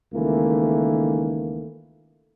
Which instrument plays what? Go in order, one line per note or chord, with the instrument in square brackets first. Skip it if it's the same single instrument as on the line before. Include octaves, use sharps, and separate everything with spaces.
[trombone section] C#2 D#3 E3 A3 A#3